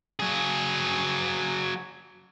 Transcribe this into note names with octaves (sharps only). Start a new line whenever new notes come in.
F#3 G#4